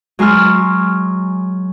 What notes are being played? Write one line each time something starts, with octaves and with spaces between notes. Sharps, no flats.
F#3 G#3 C6 F6